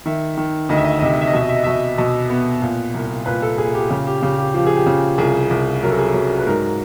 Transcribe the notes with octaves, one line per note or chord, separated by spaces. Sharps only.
D#3 E5
D#3
D2 D#5
E5
D#5
E5
D#5
C3 E5
D#5
E5
D#5
B2 E5
D#5
E5
D#5
E5
B2 D#5
B2 D#5
B3
A#2
C2
A#2 B4
A4
A#2 G#4
G4
C#3 G4
G4
C#3 G4
G4
F3 G4
G#4
G4
C#3
C2 G#4
C2
F#3 A#4
A4
G#4
A4
F#3
B4
G#2 A#4